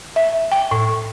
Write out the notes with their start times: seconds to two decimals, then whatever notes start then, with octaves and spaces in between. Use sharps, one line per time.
0.16 E5
0.52 G5
0.71 A2